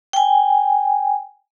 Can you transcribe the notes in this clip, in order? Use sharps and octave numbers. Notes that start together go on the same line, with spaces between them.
G5 G#5